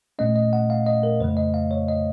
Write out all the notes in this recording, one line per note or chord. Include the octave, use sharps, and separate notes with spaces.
A#2 A3 C#4 D#5
D#5
F#5
F5
D#5
A#4
F2 C#3 A3 C5
D#5
F5
C#5
D#5